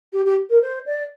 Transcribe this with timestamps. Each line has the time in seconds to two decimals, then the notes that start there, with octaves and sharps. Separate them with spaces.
0.13 G4
0.25 G4
0.50 A#4
0.62 C5
0.86 D5